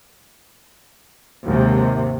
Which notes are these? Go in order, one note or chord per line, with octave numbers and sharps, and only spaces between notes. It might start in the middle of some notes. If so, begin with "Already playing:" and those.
D#2 G#2 C3